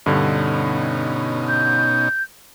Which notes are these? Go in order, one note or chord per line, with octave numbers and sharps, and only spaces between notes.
G2 B2 D3 C#4 D#4
G6